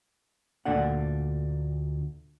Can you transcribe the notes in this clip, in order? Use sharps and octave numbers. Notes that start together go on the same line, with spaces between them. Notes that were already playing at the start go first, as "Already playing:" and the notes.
D2 A#2 D4 A4 F#5